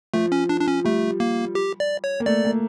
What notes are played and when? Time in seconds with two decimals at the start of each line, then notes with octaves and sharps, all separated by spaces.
0.14 F3 A3
0.32 C#4
0.49 D4
0.61 D4
0.68 C#4
0.84 G3 A3
1.20 A#3
1.55 G4
1.80 D5
2.04 C#5
2.20 A#3
2.26 A3 D5
2.45 A#3